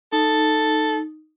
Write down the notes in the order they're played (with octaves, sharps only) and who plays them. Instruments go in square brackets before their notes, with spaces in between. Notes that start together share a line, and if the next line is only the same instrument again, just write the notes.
[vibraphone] D#4 [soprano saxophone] A4